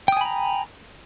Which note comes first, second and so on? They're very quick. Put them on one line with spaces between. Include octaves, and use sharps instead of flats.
G5 D#6 G#5 B5 A#5